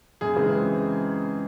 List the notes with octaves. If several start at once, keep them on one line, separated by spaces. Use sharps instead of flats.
F#2 G#4
C#3 E3 G#3 C4